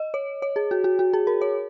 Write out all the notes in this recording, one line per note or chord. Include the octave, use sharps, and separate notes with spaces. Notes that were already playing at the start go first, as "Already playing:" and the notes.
Already playing: D#5
C#5
C#5
G#4
F#4
F#4
F#4
G#4
A#4
C#5